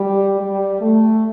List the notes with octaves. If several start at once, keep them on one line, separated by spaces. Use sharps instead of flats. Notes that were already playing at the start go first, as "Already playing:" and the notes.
Already playing: G3
G3
A3